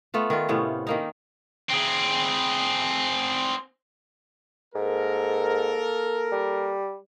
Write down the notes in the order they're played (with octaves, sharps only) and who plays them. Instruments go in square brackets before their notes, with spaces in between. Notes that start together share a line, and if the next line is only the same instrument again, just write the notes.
[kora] A3 B3 F4
D#3 F4
A2 C3 B3 C#4
D#3 A#3 D#4
[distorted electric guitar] C4 G#4
[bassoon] G#2 [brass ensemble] A#3 A4 A#4
[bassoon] G3